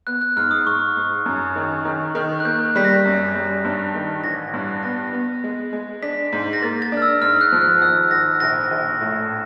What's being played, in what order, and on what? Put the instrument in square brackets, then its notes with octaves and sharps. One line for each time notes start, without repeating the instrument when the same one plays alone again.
[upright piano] B3 [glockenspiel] F#6
[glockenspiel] F#6
[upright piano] G#2 [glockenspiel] F6
[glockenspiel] D#6
[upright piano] G#2 [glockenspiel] C#6
[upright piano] G#2
F#2
D#3
D#3
D#3
[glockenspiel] F#6
[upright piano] A#3 [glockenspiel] G6
[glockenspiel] F#6
[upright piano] G3 [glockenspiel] B6
[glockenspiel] A#6
[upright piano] F#2
G3
G2
D#3
[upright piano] A1 [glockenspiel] A#6
[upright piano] G2
[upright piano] B3 [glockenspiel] A#6
[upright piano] B3
G#3
G#3
[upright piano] D4 [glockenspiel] B6
[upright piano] G#2
[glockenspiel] A#6
[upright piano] A#3 [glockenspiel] A6
[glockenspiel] A6
[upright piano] D4
[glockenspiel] F6
E6
[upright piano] G#2 [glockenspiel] F6
[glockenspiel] F#6
[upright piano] F3
[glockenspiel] F#6
[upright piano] G#1 [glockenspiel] E6
[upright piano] G#1 [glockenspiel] A#6
[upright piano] A#1 [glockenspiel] A#6
[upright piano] A#1
A2